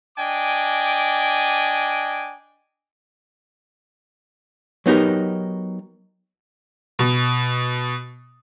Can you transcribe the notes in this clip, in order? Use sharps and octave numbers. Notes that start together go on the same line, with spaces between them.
D4 D#5 G5 G#5 D6
F#3 B3 D#4 G4 A#4
B2